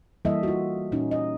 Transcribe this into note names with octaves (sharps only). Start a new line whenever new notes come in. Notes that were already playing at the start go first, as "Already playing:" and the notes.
E3 G3 A#3 A4 D#5 E5
F4 F#4
A#2 C#4 D#4
D#5